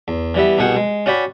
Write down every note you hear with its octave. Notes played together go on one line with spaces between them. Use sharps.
E2
E3 G3 B3 E5
C2 B2 G#4 F#5 G5
G#3
C#4 F#4 D5 G5 B5